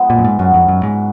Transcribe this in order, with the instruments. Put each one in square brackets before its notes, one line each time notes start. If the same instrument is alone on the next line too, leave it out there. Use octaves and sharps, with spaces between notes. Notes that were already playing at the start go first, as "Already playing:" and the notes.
Already playing: [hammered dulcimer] F3 G#3 B3 D#4
[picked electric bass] A#2
F#2
G#2
[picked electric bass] F#2 [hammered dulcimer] C#3 F#3 B3 F#4
[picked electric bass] F2
F#2
G#2